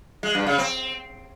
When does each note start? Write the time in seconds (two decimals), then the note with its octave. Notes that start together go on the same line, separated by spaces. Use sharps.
0.23 G#3
0.35 G2
0.47 C#3
0.58 C4